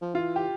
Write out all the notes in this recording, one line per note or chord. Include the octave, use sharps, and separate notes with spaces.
F3
E3 F4
G4